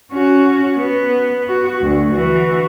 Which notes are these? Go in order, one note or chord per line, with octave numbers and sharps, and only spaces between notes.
C#4 F#4
B3
F#4
D2
E3 F#4